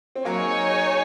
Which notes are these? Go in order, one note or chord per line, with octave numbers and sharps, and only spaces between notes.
C4
F#3 A#3 D#4 G#4 C#5 G#5